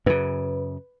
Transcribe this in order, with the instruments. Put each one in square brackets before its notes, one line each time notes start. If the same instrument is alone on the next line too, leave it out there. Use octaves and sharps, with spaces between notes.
[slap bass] F#2 C#3 [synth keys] B4